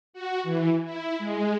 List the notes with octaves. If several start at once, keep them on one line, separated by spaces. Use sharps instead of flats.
F#4
E3
E4
G#3